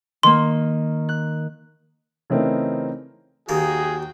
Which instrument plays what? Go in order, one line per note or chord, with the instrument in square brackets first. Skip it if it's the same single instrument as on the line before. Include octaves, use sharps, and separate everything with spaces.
[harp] D#3 A#3 [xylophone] C6
[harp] F#6
[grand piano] C#3 E3 A3 C4 D#4 A#4
[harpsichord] D#2 A#3 [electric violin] F#4 G5 [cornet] G#4